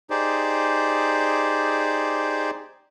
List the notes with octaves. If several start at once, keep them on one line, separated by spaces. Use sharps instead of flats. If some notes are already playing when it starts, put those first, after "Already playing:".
D#4 G4 G#4 C5 D5